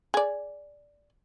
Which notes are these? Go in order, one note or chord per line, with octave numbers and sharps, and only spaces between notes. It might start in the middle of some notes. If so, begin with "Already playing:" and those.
G#4 D5